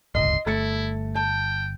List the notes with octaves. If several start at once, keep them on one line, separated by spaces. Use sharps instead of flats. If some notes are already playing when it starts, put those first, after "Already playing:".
D1 G1 C#2 D#5 C6
G1 A3 E4 A6 C#7
G5 A5